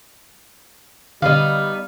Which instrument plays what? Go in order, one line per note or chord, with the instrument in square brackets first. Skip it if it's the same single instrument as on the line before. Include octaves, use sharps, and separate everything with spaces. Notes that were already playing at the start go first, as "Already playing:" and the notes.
[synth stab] D3 [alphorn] G3 [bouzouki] B3 D#4 [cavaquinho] F5